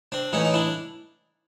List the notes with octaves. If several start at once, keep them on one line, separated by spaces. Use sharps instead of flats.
C4 D4
A2 E3 C#4 D#4
D#4
D4 E4